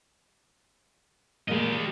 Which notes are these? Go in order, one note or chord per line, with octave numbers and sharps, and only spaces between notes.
A#2 F3 G#3 G4 D#5